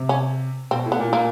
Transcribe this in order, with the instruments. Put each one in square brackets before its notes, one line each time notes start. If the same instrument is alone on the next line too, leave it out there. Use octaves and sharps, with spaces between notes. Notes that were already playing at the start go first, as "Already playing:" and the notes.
Already playing: [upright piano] C3
[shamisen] C#4
[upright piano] B2 [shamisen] C4
[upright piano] A2
[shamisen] B3
[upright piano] A#2
[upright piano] A#2 [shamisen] A#3